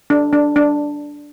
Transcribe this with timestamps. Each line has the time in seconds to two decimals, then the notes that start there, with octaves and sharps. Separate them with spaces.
0.10 D4
0.33 D4
0.56 D4